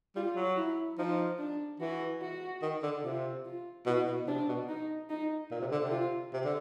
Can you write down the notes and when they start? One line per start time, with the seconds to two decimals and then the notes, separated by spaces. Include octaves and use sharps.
0.15 G3 F4
0.36 F#3
0.56 E4
0.98 F3 D#4
1.39 D4
1.80 E3 F#4
2.22 F#4
2.62 D#3
2.83 D3
3.03 C3 F4
3.45 F4
3.86 B2 E4
4.06 B2
4.27 C3 D4
4.48 B2
4.68 D#4
5.10 D#4
5.51 A#2
5.61 C3
5.71 D3
5.82 C3
5.92 F4
6.33 C3
6.44 D3